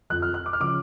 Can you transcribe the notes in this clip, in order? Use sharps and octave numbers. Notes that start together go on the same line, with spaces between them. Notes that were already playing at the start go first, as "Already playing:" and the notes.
F2 F3 F#6
F6
F#6
D6
F6
C#3 F3 D6